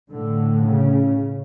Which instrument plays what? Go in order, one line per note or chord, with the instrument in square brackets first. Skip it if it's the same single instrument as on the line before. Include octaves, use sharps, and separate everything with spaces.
[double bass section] A2 D3
C#3